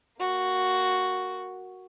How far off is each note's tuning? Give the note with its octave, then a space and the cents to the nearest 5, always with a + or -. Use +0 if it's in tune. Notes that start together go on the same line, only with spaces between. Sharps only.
A#3 +0 F#4 +0